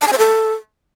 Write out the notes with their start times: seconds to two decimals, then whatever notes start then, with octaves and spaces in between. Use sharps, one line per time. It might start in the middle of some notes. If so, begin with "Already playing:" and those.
0.02 A5
0.07 G#5
0.13 C5
0.18 A4